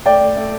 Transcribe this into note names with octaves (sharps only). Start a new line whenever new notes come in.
A3 D5 G5
A3
A3